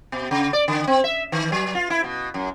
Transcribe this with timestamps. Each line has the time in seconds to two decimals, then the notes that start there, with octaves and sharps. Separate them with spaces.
0.12 B2
0.31 C#3
0.53 D5
0.68 D3
0.87 C4
1.04 E5
1.32 D#3
1.52 F#3
1.75 F4
1.90 E4
2.04 B2
2.34 F#2